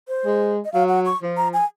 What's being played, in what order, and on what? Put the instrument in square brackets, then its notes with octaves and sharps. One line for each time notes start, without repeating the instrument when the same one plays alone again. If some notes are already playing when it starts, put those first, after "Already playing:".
[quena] C5
[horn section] G#3
[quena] D#5
[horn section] F#3 [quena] F5
[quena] F#5
C#6
[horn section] F3
[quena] A#5
G#5